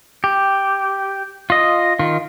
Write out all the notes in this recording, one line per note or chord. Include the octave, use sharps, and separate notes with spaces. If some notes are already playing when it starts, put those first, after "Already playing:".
G4
F4 D#5
D#3 F4